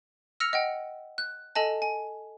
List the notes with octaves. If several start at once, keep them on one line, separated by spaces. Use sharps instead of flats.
E6 F6 A#6 C#7 F7
D#5 F#5 G5
F#6
A4 D#5 G#5 A5
G#5